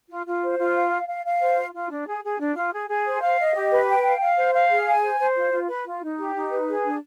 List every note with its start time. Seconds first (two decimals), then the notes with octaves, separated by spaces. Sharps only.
0.10 F4
0.26 F4
0.42 C5
0.58 F4
0.75 F5
0.91 F5
1.08 F5
1.25 F5
1.41 C5
1.57 F4
1.74 F4
1.91 D4
2.07 G#4
2.24 G#4
2.39 D4
2.56 F4
2.73 G#4
2.89 G#4
3.06 C5
3.22 F5
3.39 D#5
3.55 G4
3.71 B4
3.88 G5
4.05 F5
4.21 F5
4.37 C5
4.54 F5
4.70 G#4
4.87 G#5
5.03 C5
5.19 C5
5.36 F4
5.52 F4
5.68 B4
5.85 F4
6.02 D#4
6.18 G4
6.34 D#4
6.51 B4
6.67 G#4
6.84 D4